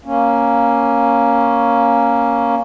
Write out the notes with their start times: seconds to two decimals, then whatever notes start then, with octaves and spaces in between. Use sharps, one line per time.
0.05 A#3 C#4